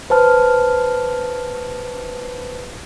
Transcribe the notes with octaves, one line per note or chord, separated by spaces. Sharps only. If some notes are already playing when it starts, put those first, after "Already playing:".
B4 C5 A5 F6